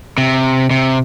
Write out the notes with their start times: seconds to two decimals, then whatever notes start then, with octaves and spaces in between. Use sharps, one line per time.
0.18 C3
0.71 C3